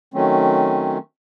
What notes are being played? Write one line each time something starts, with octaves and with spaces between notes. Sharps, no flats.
D#3 F#3 A3 C4 C#4